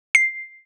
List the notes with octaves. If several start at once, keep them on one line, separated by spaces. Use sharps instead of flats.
C7